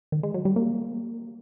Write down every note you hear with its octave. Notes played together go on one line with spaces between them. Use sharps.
D#3
G#3
F#3
G3
A#3